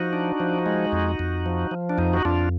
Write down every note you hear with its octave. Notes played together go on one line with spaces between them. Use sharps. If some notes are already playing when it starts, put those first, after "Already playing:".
Already playing: F3 D#4 F#4
D4
F3
G#3
F2
F2
F3
F3
D4
F2 D#4
F#4
F2 D4 F4